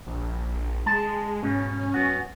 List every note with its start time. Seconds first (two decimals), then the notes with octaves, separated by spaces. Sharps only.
0.06 A#1
0.86 G#3 A5
1.43 G#2 B2 C#4
1.94 F#2 B3 F#4